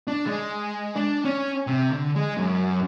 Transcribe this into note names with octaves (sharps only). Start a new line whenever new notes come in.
D4
G#3
D4
C#4
C3
D3
G#3
F#2